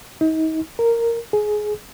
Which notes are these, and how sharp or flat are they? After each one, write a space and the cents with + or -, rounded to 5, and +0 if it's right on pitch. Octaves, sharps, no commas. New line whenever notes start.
D#4 +35
A#4 -10
G#4 +20